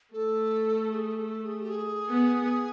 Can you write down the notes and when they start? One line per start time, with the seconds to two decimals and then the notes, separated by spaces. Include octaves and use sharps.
0.14 A3 A4
0.92 G#4
1.18 A4
1.44 G#4
1.61 G4
1.69 G#4
2.09 B3